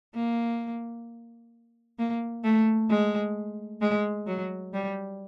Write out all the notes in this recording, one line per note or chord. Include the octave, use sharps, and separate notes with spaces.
A#3
A#3
A3
G#3
G#3
F#3
G3